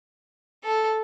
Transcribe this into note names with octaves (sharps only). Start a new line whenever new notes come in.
A4